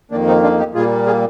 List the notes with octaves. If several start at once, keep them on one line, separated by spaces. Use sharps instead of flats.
F2 D#3 A#3 D4
C4 D#4
D4 F4
D#4 G4
A#2 G3 A#3 F4 G#4
F4 G#4